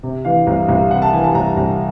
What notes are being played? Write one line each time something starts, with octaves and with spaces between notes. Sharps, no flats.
C3
E3 F5
C2
C2
C3 F#5
A5
E3 G#5
A5
C2 A#5
C2